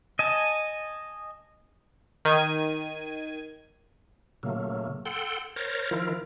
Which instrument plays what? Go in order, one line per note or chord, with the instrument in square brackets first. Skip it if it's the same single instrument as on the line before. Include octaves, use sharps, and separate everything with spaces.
[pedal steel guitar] D#5 G#5 A5
[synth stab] D#3 G#6 D#7
[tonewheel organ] A#2 C#3 F#3 A3 A#3
A4 F#5 G5 C6
A#4 C5 C#5 A6 A#6
D#3 F3 E4 F4 A#4